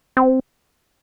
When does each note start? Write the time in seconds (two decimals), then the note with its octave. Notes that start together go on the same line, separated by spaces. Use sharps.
0.17 C4